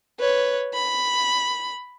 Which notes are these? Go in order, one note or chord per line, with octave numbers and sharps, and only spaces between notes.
B4 C#5
B5